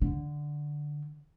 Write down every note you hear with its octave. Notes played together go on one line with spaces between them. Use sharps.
D3